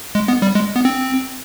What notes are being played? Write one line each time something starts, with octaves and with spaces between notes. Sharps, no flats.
G#3
B3
G3
G#3
B3
C4